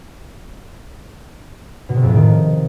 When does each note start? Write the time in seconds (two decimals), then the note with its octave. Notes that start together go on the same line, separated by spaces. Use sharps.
1.89 B2
1.96 C3
2.02 F2
2.09 A2
2.16 D#3